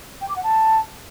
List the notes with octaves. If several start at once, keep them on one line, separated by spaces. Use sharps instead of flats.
G5
D6
F#5
A5